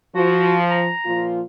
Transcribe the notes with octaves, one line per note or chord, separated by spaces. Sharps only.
F3 F#4
A#5
A#2 F3 F4